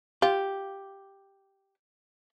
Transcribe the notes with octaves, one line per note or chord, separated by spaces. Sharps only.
F4 G4